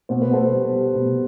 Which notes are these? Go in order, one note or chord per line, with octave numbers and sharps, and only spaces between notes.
B2 C5
B4
B2 A4 C5
G3
G3
B2